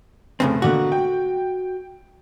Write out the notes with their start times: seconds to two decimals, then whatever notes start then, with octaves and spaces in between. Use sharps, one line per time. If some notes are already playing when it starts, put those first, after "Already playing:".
0.40 F1 A2 C#3 A3 C4
0.62 B2 D3 A#3 F#4
0.92 G5